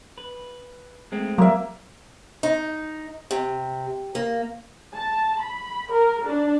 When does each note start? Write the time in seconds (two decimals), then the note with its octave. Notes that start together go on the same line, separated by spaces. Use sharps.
0.18 B4
1.12 G#3 A3 C4
1.38 F#3 A#3 E5
2.43 D#4
3.31 C3
4.15 A#3
4.96 A5
5.43 B5
5.93 A#4
6.28 D4